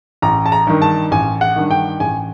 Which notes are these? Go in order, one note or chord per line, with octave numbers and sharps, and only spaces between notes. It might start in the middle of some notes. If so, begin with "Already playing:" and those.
A1 A#5
A5
A#5
G2 D#3
A5
A1 G#5
F#5
G2 D#3
G5
A1 G#5